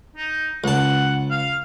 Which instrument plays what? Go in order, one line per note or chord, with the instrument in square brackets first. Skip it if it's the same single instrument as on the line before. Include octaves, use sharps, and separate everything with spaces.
[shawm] D#4
[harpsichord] C#2 A5 [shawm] F#5
[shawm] F5